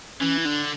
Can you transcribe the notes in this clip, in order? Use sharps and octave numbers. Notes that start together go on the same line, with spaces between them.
E3 C#4
E4
D3 D4